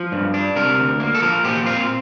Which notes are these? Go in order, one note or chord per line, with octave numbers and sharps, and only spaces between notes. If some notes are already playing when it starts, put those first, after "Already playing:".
Already playing: F3
G2
D4
C3 A#4
D2
A#3
A4
F3 A#4
A#2 G4
C4 F4